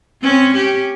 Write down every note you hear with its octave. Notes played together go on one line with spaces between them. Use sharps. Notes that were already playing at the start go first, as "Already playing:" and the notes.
C4 C#4
C#4 G4